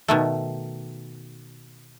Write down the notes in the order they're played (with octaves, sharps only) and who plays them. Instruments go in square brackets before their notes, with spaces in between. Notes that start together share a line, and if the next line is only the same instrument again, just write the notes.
[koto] B2 D#3 A3